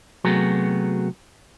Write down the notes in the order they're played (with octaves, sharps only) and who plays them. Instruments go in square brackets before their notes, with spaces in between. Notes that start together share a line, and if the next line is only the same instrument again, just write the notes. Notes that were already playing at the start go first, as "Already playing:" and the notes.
[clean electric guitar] C3 F#3 A3 B3 F#4 G#4